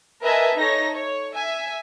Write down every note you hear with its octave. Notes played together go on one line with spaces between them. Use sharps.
A#4 B4 D#5 E5 G#5 A5
D#4 A4 C#5 A#6
C#5
E5 G#5